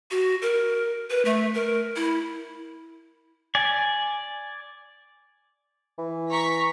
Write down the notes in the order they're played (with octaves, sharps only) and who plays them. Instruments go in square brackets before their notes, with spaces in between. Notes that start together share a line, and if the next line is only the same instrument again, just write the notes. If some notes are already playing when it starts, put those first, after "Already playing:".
[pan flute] F#4
A#4
B4
A3
A#4
E4
[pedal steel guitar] D5 G#5
[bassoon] E3
[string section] A#5 C#6 B6